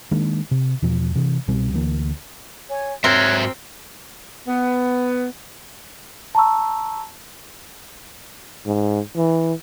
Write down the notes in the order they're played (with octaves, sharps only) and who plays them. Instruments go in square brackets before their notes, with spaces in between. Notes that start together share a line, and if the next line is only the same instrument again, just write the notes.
[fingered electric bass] D#3 G#3 A#3 D4
C3
E2 B2 F3
C3 E3
C2 B2 G3 C4
D2 E3 A#3
[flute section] C#5 G#5
[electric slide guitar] G#2 F#4 E5 [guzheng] C4 A#4 [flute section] C#5 F#6 G#6
[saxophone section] B3
[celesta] A5 A#5 C#6 E6
[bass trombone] G#2
E3